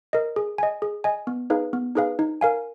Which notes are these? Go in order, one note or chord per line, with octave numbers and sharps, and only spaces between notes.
A#4 D#5
G#4
D#5 G#5
G#4
D#5 G#5
B3
D#4 G#4 B4 F5
B3
D#4 G#4 B4 F5
D#4
A#4 F5 G#5